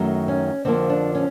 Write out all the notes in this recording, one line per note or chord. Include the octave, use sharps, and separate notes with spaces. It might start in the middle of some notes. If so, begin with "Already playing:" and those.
Already playing: F#2 D#3 F#3 A3
C#4
F2 D3 F3 A#3 C4
D4
C#4